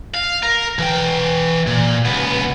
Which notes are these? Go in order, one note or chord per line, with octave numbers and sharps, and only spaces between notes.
F5
A#4
E3 G5
A#2
C#2 B3